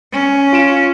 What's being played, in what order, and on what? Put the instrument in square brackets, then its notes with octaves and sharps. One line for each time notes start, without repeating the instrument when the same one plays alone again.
[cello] C#4
[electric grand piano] F4 D7 E7